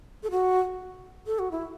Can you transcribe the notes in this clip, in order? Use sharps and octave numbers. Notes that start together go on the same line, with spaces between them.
A4
F#4
A4
F#4
E4